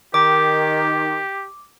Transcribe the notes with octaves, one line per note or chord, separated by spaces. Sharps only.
D#3 G4 D6